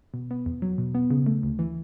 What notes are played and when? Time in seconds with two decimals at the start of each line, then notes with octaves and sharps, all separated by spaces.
0.14 B2
0.31 B3
0.46 E2
0.62 F#3
0.78 B2
0.95 B3
1.11 C#3
1.26 A3
1.43 D2
1.59 E3